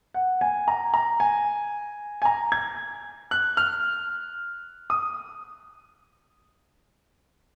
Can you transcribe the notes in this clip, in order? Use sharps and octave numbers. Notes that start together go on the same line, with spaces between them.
F#5
G#5
A#5
A#5
G#5
G#5
A#5
G#6
F#6
F6
D#6